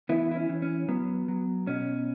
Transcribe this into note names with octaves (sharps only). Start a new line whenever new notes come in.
E3 B3 E4
E4
C#4
E3
C#4
F#3 B3
F#3
B2 C#4